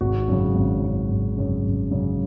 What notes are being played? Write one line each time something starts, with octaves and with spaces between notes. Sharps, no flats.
G#1 F#4
F#2 C#3
G#1
F#2 C#3
G#1
F#2 C#3
G#1
F#2 C#3